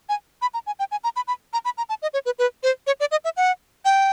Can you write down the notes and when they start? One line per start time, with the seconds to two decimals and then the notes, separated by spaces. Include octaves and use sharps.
0.09 G#5
0.42 B5
0.54 A#5
0.67 G#5
0.79 G5
0.91 G#5
1.04 A#5
1.16 B5
1.27 B5
1.53 A#5
1.65 B5
1.78 A#5
1.89 A5
2.02 D#5
2.14 C#5
2.26 B4
2.39 B4
2.63 C5
2.87 C#5
3.00 D5
3.11 D#5
3.25 E5
3.37 F#5
3.85 G5